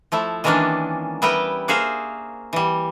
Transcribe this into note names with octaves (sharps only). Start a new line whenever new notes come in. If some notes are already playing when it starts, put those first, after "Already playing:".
F3 A3 E4
D#3 E3 G#3 A#3 C#4 D4
G3 B3 E4 A#4 B4 G5
A#3 F#4 G#4 C5 E5 F5
E3 G3